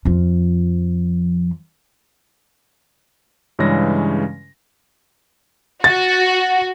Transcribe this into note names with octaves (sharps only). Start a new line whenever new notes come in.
F2 F3
G2 C#3 E3 G#3 C#4 A#6
F#4 A6